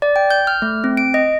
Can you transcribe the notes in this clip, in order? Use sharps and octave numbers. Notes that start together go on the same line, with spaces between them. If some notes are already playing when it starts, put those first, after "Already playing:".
D5
G5
G6
F6
A3
C4
D7
D#5